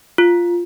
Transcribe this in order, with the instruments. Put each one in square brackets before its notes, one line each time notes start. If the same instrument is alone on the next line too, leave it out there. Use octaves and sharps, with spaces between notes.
[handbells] F4